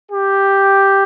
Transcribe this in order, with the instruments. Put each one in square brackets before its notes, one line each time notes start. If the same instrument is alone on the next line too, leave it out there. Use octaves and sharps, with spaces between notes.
[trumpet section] G4